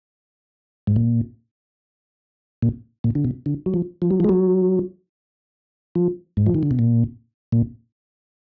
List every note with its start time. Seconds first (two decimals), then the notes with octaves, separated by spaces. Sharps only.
0.87 G#2
0.96 A#2
2.62 A#2
3.04 A#2
3.15 D3
3.25 B2
3.46 D3
3.66 F#3
3.74 F3
4.02 F3
4.11 F#3
4.20 F3
4.24 G#3
4.29 F#3
5.95 F3
6.37 G#2
6.46 F3
6.54 D#3
6.63 D3
6.71 B2
6.79 A#2
7.52 A#2